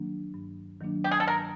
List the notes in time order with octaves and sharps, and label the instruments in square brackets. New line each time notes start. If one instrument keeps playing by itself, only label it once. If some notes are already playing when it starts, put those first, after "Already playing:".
Already playing: [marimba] D#3 F#3 A#3 D4
G2
D#3 F#3 A#3 D4
[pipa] G4
G#4
A4
[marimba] G2 [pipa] A#4